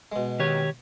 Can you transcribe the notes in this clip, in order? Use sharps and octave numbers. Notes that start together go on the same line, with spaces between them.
B2 G#3
D#3 G4 C#5